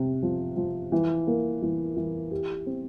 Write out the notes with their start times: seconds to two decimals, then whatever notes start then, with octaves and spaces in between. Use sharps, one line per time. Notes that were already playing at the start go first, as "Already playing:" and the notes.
Already playing: C3
0.23 F3
0.57 F3
0.92 E3
1.27 A#3
1.62 E3
1.97 E3
2.31 G4
2.66 C4